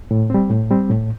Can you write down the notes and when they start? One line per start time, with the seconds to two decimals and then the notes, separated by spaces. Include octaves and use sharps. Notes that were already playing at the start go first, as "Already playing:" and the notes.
0.11 A2
0.30 G3 C4
0.50 A2
0.70 G3 C4
0.89 A2